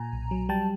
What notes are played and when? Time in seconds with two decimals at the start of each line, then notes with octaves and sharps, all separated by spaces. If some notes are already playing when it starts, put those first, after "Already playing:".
Already playing: A#2 G#5 A#5
0.12 B1
0.31 F#3
0.49 G3 G5 A5